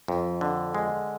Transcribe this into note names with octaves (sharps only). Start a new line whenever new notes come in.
F2
D3
G#3